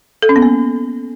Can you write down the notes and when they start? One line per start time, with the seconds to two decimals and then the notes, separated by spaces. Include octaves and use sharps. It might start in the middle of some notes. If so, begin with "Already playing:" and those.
0.22 A4
0.29 C#4
0.36 B3
0.42 A#3